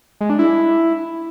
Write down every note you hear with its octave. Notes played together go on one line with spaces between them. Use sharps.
G#3
D4
E4